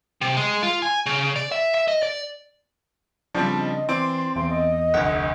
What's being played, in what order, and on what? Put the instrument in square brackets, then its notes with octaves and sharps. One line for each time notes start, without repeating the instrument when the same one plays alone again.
[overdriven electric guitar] C3
G#3
F4
G#5
C#3
D5
E5
E5
D#5
D5
[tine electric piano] C#3 D4 [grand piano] F3 G3 C4
[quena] D#5
[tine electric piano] E3 [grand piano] C4 D5 [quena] C6
[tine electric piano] E2 [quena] C6
[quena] D#5
[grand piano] F1 D2 [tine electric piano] F#5